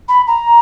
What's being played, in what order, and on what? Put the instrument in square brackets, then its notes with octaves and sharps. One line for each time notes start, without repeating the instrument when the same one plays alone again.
[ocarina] B5
A#5